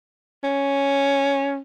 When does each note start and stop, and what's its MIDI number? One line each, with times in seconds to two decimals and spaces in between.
0.44 1.59 61